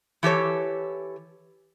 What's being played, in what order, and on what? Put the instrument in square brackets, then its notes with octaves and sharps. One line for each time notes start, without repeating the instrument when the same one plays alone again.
[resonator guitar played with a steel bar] E3 G4 A4 C#5